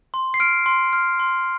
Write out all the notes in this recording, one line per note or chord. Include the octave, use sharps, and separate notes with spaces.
C6
C7
F6 D7
C6
F6
C6